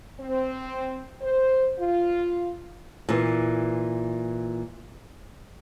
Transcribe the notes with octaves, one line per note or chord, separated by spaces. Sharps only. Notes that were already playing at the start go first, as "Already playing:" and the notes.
C4
C5
F4
A#2 E3